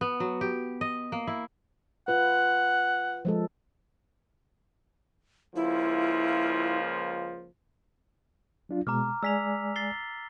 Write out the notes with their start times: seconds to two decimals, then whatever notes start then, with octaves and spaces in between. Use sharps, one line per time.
0.01 B3
0.20 F#3
0.41 G4
0.81 D#5
1.12 A#3
1.27 E4
2.08 F4 B4 F#5
3.25 F3 G#3 A4
5.56 C#2 F3 A#3 E4
8.69 F#3 D4 F4
8.87 B2 G#3 A#5 D6 F6
9.23 G#3 D5 G#5 E6 B6 F7
9.76 A6 C7 G7